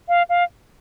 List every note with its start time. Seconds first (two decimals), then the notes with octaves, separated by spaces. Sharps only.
0.08 F5
0.29 F5